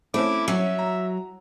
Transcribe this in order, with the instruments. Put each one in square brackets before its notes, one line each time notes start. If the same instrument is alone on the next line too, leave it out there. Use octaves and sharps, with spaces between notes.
[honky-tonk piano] A3 C4 C#4 [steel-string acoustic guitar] E4 [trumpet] D6
[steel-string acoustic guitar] F#3 [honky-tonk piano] C#4 [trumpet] E5
[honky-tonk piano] A#5